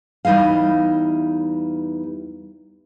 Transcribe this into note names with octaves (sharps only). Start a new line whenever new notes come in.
E2 G3 D#4 E4 F5